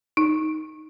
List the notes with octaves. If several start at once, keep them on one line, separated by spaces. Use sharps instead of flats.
D#4